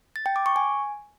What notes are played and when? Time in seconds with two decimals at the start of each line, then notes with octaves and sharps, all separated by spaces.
0.16 A6
0.26 G5
0.36 D6
0.46 C#6
0.56 G#5